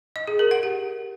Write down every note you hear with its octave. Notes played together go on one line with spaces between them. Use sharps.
D#5
G#4
A#4
F#5
G4